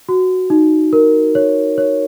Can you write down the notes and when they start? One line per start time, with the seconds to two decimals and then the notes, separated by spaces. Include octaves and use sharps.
0.09 F#4
0.50 D#4
0.93 A#4
1.35 C#5
1.78 C#5